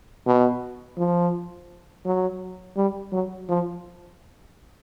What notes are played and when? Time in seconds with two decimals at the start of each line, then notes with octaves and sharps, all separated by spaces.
0.26 B2
0.97 F3
2.05 F#3
2.76 G3
3.12 F#3
3.49 F3